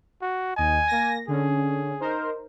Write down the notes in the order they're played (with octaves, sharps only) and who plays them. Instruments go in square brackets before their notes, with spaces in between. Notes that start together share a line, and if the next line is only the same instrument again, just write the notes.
[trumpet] F#4
[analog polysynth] D#2 D#5 [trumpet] G#5
[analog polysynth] A#3 A#6
[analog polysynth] D3 C#4 [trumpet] G#4
[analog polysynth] D#4 A#4 C5